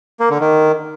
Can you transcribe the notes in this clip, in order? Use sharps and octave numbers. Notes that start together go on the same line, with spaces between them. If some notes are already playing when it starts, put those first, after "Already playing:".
A#3
D3
D#3